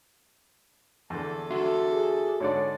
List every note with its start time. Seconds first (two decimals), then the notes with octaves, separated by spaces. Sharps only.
1.10 E2 D3 A4
1.51 D4 F#4 A4 E5 C6
1.92 G#4
2.40 G#2 D3 C#5 D5